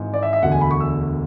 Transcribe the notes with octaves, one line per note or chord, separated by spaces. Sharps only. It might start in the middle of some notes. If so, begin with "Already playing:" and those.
Already playing: G#1 G#2 E3
D5
E5
E5
E1 D2 D3 F#5
G#5
B5
C#6
E6